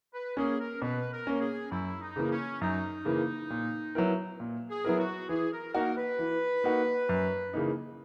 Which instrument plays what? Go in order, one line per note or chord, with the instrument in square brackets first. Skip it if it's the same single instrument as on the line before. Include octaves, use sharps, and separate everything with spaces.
[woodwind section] B4
[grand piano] A#3 C#4 [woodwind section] G#4
[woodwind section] A#4
[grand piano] B2 [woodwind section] B4
[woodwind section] A#4
[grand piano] A#3 C#4
[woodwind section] G#4
[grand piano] F#2 [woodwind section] E4
[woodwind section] D#4
[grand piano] C#3 E3 A#3
[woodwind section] C#4
[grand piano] F#2 [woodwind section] D#4
[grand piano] C#3 E3 A#3
A#2
F#3 B3 E4 A#4
A#2
[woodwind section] G#4
[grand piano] F#3 B3 E4 A#4
[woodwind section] F#4
[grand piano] E3 [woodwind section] G#4
[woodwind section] A#4
[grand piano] A#3 D#4 F#4 [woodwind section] A#4
[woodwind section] B4
[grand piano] E3
A#3 D#4 F#4
F#2
C#3 E3 A#3 D#4